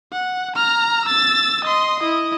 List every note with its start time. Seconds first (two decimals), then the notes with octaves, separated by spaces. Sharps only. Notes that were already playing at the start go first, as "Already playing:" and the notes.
0.12 F#5
0.56 A#5 F6
1.05 E6 A6
1.65 D#5 C6
2.00 E4 D#5